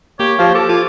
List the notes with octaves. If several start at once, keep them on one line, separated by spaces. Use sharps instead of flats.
A#3 G4 C#5
F3 G4 C5 F5
A4 D6
F4